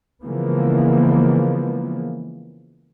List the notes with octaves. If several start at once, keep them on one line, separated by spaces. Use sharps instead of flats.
C#3 E3 F3 G#3 A#3 B3